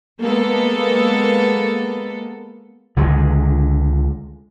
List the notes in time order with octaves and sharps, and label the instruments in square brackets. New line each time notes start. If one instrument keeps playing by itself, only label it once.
[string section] G#3 A#3 B3 A4
[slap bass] C#2 D3 F3 G#3